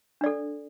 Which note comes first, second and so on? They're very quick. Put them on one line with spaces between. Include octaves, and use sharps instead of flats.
D4 D5 A4